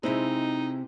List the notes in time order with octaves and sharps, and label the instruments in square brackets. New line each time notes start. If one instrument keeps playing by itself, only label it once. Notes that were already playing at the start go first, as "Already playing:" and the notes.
[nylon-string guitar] C3 C4 [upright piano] G#3 E4 [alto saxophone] D#4